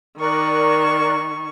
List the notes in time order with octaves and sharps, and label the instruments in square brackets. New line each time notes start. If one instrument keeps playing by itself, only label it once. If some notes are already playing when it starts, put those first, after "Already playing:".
[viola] D#3 C#6 [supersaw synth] A#4 D5 F#6